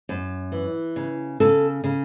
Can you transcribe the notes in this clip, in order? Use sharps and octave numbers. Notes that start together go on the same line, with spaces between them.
F#2
E3
C#3
C#3 A4
C#3